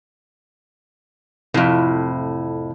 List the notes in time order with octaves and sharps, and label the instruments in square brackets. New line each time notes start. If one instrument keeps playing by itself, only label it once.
[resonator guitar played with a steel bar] F2 A2 [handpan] C3 F3 E4